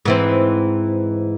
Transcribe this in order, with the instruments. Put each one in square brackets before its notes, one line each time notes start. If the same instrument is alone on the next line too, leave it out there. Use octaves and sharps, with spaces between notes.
[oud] G#2 E3 C4